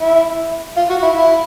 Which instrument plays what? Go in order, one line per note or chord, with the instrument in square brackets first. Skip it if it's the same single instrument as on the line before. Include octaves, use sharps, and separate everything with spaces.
[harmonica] E4
F4
F#4
E4
E4